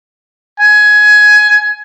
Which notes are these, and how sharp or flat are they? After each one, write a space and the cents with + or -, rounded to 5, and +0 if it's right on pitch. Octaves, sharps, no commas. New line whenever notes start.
G#5 +15